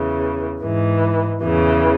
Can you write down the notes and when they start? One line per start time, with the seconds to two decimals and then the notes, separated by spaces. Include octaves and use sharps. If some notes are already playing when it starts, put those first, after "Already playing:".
Already playing: E2 C#3 E3
0.61 G#2 E3
1.42 E2 C#3 E3